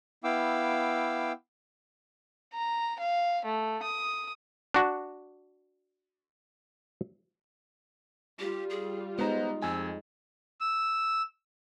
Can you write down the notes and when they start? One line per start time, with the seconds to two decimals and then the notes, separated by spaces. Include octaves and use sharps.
0.24 B3 E4 F5 G5 D6 E6
2.54 A#5
3.00 F5
3.45 A3
3.83 D#6
4.74 D4 F#4
8.40 G3 F4 G4
8.70 G#4
9.19 G#3 B3 D#4 C5 A#5
9.62 F2 G#5 E6
10.61 E6